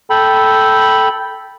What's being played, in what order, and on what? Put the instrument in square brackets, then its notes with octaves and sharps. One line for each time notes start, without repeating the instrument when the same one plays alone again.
[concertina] A4 G5 B5